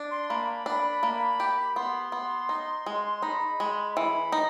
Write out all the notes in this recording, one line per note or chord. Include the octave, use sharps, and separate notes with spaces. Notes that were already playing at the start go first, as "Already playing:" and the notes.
Already playing: D4
C6
A#3 B5
D4
A#3
G4
B3 C6
B3
D#4
G#3
D#4 B5
G#3
E3 B5
D#4